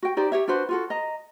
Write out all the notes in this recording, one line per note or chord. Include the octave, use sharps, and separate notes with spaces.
F#4 G5
D#4 G4 C5 D5
G4 C#5 E5
D4 F#4 B4 C5
F4 F#4 A4
D#5 A#5